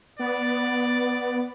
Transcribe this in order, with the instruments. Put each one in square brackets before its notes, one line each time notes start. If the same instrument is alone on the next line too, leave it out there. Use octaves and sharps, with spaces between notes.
[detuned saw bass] B3 [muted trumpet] D5